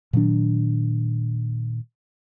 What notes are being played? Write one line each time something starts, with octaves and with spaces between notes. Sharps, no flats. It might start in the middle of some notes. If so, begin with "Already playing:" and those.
A#2 D#3 F#3 D4